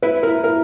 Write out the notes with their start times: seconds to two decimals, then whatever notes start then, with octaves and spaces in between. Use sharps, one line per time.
0.02 E4 B4
0.23 E4 A#4
0.44 A#4